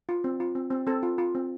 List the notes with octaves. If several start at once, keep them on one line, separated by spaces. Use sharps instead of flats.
F4
C4
F4
C4
C4
C4 A4
F4
F4
C4